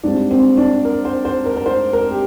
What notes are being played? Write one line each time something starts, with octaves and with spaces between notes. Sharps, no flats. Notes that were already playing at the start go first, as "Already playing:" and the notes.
G#2 G3 C4 D4
C4
D4
A#4
C5
C5
A#4
A#4
C5
A#4
G4